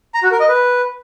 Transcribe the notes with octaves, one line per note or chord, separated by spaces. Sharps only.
A#5
F#4
A#4
D#5
B4